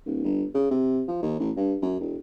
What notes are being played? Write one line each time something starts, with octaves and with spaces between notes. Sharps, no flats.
D1
G1
C#3
C3
F3
D#2
A1
G2
F#2
E1